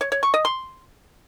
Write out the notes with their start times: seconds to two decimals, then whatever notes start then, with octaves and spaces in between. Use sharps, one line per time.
0.01 C#5
0.12 C#5
0.23 C#6
0.34 D#5
0.45 C6